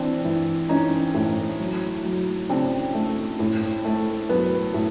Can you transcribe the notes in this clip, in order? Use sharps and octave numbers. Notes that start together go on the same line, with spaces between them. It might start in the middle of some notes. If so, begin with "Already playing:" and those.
Already playing: E3 C4 D4
E3
E3 C#4 D#4
A2
F#3
F#3
C#3 C4 D4
A3
A2
A3
F#3 B3
A2